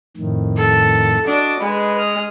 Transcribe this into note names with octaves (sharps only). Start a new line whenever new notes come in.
F2 A2 D#3
A4
D4 F#4 D#5 D6
G#3 B4
D#6 F6